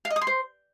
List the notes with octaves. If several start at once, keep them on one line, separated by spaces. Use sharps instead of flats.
F5
D#5
D#6
C6
C5